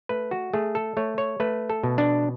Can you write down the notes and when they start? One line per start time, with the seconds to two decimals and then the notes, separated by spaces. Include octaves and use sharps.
0.09 A3 B4
0.31 F#4
0.53 A3 G#4
0.75 A4
0.97 A3 C#5
1.18 C#5
1.40 A3 B4
1.70 A4
1.84 B2
1.98 D4